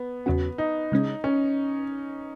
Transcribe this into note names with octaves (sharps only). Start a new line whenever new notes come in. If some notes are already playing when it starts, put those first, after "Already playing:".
Already playing: B3
E2 C#3 F#3 C#4 F#4
D#4
C#3 G#3 C#4
C#4